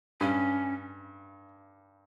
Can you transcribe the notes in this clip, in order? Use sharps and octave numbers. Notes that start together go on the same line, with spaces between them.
G2 C#4